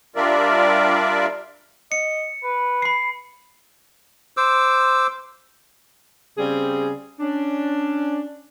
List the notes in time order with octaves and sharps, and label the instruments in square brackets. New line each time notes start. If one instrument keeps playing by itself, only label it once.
[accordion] G3 D4 F4 A#4 D5 E5
[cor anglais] D#5 [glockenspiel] C#7
[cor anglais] B4
[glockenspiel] B5 C7
[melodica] C5 D6 E6
[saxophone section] C#3 G3 C4 G#4
C#4 D4